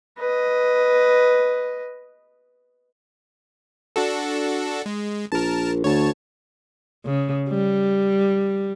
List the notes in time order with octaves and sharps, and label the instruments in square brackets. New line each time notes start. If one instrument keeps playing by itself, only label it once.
[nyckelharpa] B4 D#5
[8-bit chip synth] D4 F#4 A4
G#3
[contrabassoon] A#1 [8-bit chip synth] A#4 A5
[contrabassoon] D2 [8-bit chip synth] C#5 A5
[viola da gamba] C#3
G3